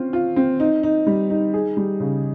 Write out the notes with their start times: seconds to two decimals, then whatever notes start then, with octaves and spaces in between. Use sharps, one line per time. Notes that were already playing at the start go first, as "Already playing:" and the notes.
Already playing: C4 C#4 F4
0.13 F4
0.36 C4
0.60 D#4
0.83 D#4
1.07 G3
1.30 D#4
1.54 G#4
1.77 G3
2.00 C#3